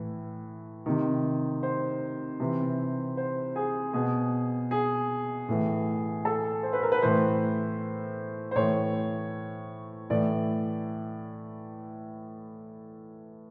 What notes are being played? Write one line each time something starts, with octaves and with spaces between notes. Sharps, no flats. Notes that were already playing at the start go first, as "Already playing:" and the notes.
Already playing: A2 E3
C3 D#3
C5
C3 E3
C5
G#4
B2 G#4
G#4
A2 E3
A4
C5
B4
A#4
B4
A2 E3 C5
C5
A2 E3 C#5
A2 E3 D5